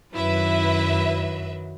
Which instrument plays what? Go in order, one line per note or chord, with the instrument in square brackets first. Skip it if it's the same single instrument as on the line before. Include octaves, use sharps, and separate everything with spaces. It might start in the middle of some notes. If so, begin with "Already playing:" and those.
[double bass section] F#2 [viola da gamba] D#3 F#3 [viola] E4 [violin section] B4 E5